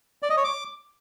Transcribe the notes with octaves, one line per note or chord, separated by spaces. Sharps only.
D5
D#5
C#5
D6